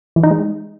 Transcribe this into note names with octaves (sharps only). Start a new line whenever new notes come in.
E3
D#4
G#3